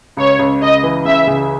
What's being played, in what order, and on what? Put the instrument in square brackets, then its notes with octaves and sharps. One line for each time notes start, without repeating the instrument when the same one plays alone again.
[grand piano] C#2 [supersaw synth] C#5
[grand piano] C#2
[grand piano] C#2 [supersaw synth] D#5
[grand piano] E3
[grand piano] C#3 [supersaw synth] E5
[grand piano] C#3